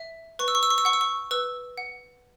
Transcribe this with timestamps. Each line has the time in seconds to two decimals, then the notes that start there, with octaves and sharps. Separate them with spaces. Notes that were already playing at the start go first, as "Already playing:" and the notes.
Already playing: E5
0.39 B4 C#6
0.48 E6
0.55 C#6
0.63 E6
0.70 C#6
0.78 E6
0.85 F#5 C#6
0.93 E6
1.01 C#6
1.31 B4 E6
1.77 F#5